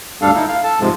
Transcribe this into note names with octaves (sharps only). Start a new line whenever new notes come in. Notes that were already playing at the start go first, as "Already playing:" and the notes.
D2 G2 G3 D4 A4 F5
D#4 E4 A4
F5
A4 A5
G#2 C3 F3 G#3